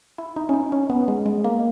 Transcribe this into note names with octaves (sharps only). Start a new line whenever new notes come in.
E4
D#4
C#4
D#4
C#4
B3
G#3
G#3
A#3